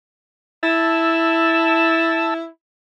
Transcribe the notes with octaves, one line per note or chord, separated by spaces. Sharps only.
E4 A5 E6